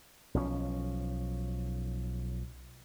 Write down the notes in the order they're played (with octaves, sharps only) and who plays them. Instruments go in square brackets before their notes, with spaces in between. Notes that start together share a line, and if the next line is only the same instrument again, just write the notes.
[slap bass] B1 F3 C#4